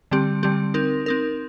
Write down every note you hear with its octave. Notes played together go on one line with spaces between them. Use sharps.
D3 G3 C4 G4
D3 G3 C4 G4
C4 D#4 A#4
C4 D#4 A#4